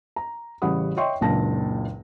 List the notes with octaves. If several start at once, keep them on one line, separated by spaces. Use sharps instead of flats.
A#5
A1 C#3 G3 F#5 B5 D#6
C#5 D#5 E5 G5 C6 C#6
F#1 C#2 A#2 D4 A5 A#6